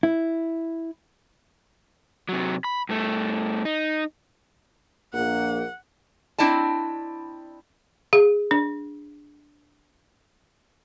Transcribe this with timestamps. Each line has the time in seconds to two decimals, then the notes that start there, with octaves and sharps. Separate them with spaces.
0.03 E4
2.29 C3 F#3
2.64 B5
2.89 G2 A3
3.65 D#4
5.14 A#1 A#3 F#5
6.38 C4 D4 E4 D5 D#5 A5
8.13 G#4
8.51 D4